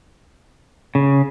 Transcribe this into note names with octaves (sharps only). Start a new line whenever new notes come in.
C#3